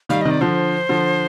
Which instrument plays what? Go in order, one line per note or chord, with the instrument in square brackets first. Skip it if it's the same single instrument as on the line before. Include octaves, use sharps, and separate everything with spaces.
[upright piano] D#3 G3 [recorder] F5
[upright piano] C3 D#3 [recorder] D#5
[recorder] D5
[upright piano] D3 F3 [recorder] C5
[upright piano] D3 F3